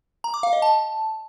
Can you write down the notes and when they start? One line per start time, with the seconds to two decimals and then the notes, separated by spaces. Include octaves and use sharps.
0.24 A#5
0.34 D6
0.43 F5
0.53 D#5
0.62 A5